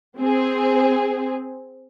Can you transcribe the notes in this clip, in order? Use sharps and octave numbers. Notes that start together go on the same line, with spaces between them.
C4 G#4